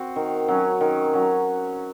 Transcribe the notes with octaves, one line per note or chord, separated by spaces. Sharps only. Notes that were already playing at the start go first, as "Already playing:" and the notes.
Already playing: C4 F#4
D#3
F#3 C#4
D#3
F#3 C#4